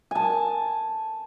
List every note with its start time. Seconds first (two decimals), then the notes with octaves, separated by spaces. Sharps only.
0.11 G#5 A5